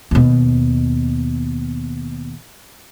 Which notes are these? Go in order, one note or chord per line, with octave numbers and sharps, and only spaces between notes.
D#2 B2